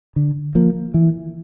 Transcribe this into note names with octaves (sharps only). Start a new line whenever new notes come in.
D3
F3 A#3
E3